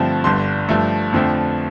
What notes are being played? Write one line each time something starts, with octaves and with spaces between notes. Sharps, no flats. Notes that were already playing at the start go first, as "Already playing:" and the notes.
Already playing: G2 D3 F3 A3 C4
G1 G2 D3 C6
G2 F3 A3
F2 D3 F3 A3 C4